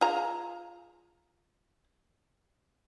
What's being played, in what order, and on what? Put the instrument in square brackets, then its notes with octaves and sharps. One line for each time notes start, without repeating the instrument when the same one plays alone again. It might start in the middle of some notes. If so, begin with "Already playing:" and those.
[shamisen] F4 G#4 A#5